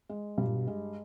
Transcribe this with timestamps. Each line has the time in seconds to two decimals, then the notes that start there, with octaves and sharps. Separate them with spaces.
0.09 G#3
0.38 G2 B2
0.47 A#2
0.55 B2
0.67 G#3